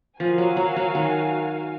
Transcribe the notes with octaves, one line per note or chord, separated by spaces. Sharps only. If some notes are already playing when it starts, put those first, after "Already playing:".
F3 F#4 A#4 F5 G#5
F#3
F#3
F#3
D#3